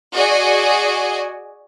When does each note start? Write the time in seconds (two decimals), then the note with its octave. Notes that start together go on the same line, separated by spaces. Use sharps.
0.13 F#4 G#4 D5 D#5 G#5